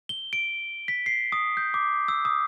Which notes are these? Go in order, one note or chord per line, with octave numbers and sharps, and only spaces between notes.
G7
D7
B6
C7
D#6
G6
D6
E6
D#6